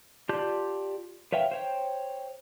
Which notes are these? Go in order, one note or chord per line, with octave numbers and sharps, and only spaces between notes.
F4 G4 D5 A5 G6
B4 C#5 E5 F5 G5
C5 C#5 G5